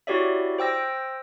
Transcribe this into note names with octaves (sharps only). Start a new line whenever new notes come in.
E4 F#4 G4 C#5 D5 E5
C5 G5 E6 A#6